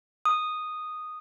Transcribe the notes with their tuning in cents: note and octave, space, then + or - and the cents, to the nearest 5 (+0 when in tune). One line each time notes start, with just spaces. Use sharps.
D#6 -5